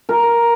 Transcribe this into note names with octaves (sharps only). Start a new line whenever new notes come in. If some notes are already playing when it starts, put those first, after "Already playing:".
A#4